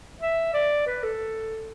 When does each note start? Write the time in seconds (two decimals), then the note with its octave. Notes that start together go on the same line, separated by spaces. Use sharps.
0.21 E5
0.54 D5
0.87 B4
1.03 A4